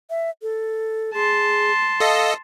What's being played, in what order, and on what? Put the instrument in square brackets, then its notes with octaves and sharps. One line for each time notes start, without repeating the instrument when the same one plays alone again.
[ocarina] E5
A4
[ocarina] G#4 [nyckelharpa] A5 C6
[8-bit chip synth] A4 D#5 [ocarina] F5